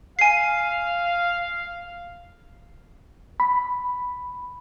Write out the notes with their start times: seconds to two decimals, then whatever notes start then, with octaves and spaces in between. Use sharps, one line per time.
0.19 F5 G#5 C7
3.40 B5